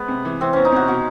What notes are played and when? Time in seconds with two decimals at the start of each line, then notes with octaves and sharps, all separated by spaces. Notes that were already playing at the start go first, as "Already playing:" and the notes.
Already playing: G#3 B3
0.08 C3
0.25 E3
0.41 E3 C4
0.53 E2 C#4
0.65 D#4
0.72 C3 F#4
0.88 B2 F#4